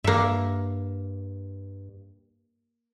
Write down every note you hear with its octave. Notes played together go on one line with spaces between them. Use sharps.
G2 A#3 E5